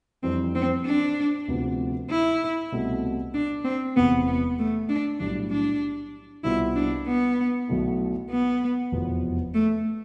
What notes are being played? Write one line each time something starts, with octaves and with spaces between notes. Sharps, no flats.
F2 E3 G3 C4 D4
C4
D4
D2 C3 F3 B3
E4
C2 B2 A3 C4
D4
C4
E1 E2 C3 E3 B3
B3
A3
D4
B1 A2 G3 D4
D4
C2 B2 B3 E4 F4
D4
B3
B1 B2 A3 E4
B3
F1 E2 B2 B3 F4
A3